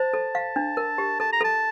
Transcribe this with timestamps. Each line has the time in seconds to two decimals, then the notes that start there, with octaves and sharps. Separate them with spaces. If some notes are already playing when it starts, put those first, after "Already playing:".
Already playing: C5 A5
0.14 A4
0.35 F5
0.56 D4
0.77 A#4
0.98 G4
1.20 A4 A5
1.33 A#5
1.41 A4 A5